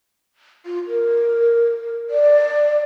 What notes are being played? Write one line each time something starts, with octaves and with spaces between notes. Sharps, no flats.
F4
A#4
D5